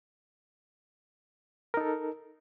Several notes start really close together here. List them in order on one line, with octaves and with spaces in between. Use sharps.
A#4 D#4 A4